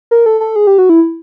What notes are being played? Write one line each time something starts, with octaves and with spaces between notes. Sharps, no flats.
A#4
A4
A4
G#4
G4
F#4
E4